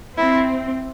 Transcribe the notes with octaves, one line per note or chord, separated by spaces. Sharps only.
C4 E4